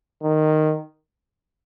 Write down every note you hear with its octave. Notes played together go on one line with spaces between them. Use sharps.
D#3